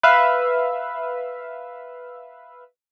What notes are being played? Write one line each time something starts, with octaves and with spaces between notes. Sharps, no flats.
B4 E5 F5